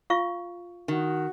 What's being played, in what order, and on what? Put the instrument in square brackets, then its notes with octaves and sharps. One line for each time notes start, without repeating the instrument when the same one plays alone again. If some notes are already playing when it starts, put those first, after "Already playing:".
[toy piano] F4 F5 C#6
[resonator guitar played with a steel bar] D#3 [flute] F#4